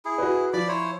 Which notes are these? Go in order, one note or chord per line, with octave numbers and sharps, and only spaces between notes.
E4 G#4
F#4 B4
F3 D5 B5 D6
E4 C5 C#5